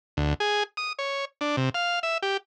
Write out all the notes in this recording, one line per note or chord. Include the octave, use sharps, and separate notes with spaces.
D2
G#4
D#6
C#5
D4
C3
F5
E5
G4